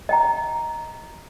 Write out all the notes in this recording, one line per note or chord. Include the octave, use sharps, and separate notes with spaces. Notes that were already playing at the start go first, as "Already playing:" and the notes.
D#5 G5 A#5